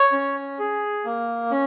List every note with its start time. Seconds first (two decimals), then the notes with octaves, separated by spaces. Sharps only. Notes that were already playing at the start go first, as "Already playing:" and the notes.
Already playing: C#5
0.12 C#4
0.59 G#4
1.05 A#3
1.51 C#4